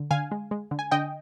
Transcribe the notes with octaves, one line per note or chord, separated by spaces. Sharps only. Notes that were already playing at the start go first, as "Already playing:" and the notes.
Already playing: D3
D3 F5 G#5
G#3
G#3
D3
G#5
D3 D#5 G5